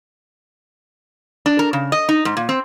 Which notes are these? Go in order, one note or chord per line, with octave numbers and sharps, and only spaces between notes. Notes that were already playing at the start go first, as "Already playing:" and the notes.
D4
A#4
C#3
D#5
D#4
G#2
A#2
C4